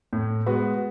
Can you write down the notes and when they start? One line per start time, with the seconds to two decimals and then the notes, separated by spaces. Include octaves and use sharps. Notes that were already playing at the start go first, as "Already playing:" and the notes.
0.13 A2
0.46 G#3 B3 F#4 B4